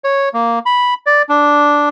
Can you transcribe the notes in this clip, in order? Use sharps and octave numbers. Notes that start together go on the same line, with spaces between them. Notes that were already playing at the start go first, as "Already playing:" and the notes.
C#5
A#3
B5
D5
D4